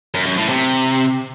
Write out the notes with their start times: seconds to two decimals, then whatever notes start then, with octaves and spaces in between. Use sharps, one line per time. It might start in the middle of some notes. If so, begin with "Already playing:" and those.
0.15 F#2
0.26 F#2
0.38 A2
0.50 C3